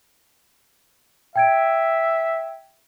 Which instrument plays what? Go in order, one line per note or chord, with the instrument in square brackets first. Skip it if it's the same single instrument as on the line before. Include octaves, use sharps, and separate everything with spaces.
[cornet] E5 [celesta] G5 G#6 D7